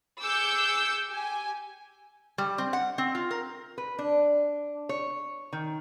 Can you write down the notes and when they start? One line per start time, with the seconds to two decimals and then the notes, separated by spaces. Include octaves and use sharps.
0.21 G#4 D6 E6 G6 C#7
1.07 G4 G#5
2.38 G3
2.58 C4
2.73 F#5
2.98 C4
3.15 F4
3.31 A#4
3.78 B4
3.99 D4
4.89 C#5
5.53 D#3